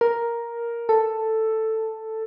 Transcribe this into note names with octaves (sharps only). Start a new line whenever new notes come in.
A#4
A4